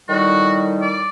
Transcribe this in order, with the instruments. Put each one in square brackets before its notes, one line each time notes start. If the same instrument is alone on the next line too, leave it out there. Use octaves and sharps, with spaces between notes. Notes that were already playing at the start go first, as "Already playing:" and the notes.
[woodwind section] A2 D#3 G3 [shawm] F#4
[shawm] D5